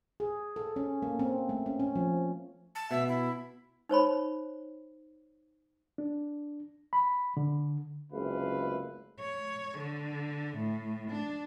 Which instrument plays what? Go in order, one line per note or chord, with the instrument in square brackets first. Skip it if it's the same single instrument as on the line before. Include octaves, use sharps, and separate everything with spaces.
[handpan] G#4
A4
C#4
A#3
C4
A3
C#4
C#4
F3
[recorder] A5
[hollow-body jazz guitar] B2 [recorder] E5
[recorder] E4
[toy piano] D#4 C5 C#5 B5
[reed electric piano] D4
B5
D3
[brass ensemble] F#1 C#2 C3 A3 B4 F5
[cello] C#5
D3
A2
D4